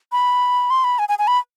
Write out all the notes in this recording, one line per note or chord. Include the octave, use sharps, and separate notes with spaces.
B5
C6
B5
G#5
G#5
G#5
B5